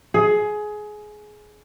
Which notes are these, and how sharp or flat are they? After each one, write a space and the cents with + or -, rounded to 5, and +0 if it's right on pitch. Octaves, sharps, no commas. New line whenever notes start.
G#4 +20